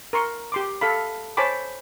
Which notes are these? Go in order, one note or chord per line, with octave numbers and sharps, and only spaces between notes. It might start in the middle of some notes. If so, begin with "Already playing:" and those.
A#4 C6 C#6
G4 C6 D6
A4 F5 B5
C5 C#5 G#5 A5 B5 D6